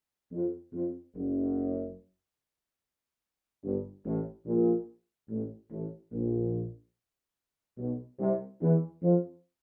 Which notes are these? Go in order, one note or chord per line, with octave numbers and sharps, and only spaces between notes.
F2
F2
F#1 F#2
G1 G2
A1 A2
A#1 A#2
A1 A2
A1 A2
A#1 A#2
B1 B2
C2 C3
E2 E3
F2 F3